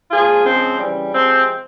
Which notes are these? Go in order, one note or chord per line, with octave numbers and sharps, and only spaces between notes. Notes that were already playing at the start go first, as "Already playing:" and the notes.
A#2 F3 G#3 F4 G#4
C#3 F3 G#3 C4
C#3 E3 G3
C3 F3 G#3 C4